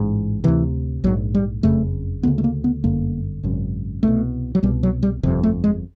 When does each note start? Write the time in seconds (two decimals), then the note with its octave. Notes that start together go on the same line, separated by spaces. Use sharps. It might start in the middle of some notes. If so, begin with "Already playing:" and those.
Already playing: A1 G#2
0.44 D2 C3 E3
1.04 A#1 G#2 F#3
1.35 G3
1.63 F#1 F2 C#3 A3
2.23 D2 C#3 B3
2.38 A3
2.44 A#3
2.64 B3
2.84 G1 F#2 D3 A#3
3.43 G#1 F#2 C#3
4.03 C2 B2 A3
4.55 F#3
4.63 C2 B2 G3
4.83 F#3
5.03 G3
5.23 G1 F2 C3
5.43 A3
5.64 G#3